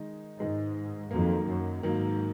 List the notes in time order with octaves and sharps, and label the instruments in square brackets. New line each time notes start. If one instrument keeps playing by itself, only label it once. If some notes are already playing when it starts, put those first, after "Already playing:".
Already playing: [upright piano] D#3 G#3 D#4
[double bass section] G#2 [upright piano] D#3 G#3 D#4
[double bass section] F2 [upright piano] D#3 F#3 A#3
[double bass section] F#2
[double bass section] G#2 [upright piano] D#3 F#3 A#3